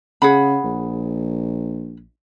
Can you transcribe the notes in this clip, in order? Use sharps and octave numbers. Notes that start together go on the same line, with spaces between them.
C#3 G#4 F#5 B5
A#1